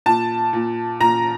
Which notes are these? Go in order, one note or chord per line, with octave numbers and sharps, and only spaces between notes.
A#2 A5
A#2
A#2 A#5